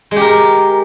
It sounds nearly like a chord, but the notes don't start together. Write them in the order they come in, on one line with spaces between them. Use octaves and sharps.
G#3 G4 A#4